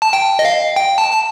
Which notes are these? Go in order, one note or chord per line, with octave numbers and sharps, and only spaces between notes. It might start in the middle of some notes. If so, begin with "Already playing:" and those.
A5
G5
D#5
F5
G5
A5
A5